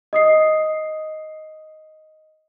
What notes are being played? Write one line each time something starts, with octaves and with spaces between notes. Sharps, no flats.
D#5 D#6 C7